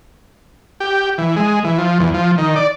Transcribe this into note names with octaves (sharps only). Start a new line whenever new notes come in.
G4
E3
G#3
E3
F3
E2
F3
D#3
D5